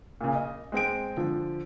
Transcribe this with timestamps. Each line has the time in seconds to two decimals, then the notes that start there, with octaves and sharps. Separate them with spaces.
0.21 A#2 C#3
0.35 D#5
0.72 G#3 C4 G5 D7
1.17 D3 F3